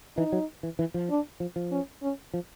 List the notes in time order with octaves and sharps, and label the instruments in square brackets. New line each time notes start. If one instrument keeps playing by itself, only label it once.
[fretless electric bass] E3 [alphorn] D#4
[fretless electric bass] F#3
E3
E3
F3
[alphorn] D4
[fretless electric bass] F3
F3
[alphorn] C#4
C#4
[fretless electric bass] F3